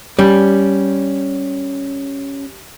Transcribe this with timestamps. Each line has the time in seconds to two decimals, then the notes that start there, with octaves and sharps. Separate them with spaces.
0.19 G3 C#4